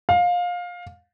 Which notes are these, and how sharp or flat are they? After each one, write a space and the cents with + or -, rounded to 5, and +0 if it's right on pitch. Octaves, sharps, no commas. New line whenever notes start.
F5 +20